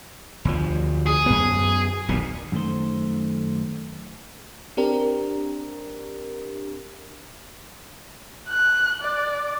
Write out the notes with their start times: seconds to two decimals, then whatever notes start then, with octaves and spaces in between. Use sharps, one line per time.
0.45 D2 F3
1.06 G#4
1.26 F#2 B3
2.08 D#1 B1 A#2
2.52 F#2 D#3 E3 A3 C5
4.77 C4 D4 G4 A#4
8.49 F#6
9.02 D5